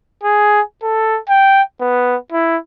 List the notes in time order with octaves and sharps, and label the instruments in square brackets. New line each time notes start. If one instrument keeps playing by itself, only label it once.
[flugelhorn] G#4
A4
G5
B3
E4